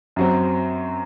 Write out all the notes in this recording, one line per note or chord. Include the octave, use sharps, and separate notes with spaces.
F#2 F#3 C4